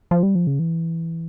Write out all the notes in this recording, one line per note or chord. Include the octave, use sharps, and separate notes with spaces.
F3
G3
F3
C#3
E3